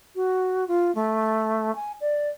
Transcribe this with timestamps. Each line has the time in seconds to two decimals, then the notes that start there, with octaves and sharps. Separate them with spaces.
0.16 F#4
0.68 F4
0.95 A3
1.76 G#5
2.01 D5